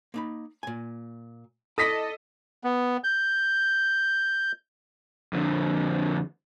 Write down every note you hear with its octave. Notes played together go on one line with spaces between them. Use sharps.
A#3 D#4 B5
A#2 G#5
E4 A4 D5 D#5 D#6 A#6 B6
B3
G6
F2 D3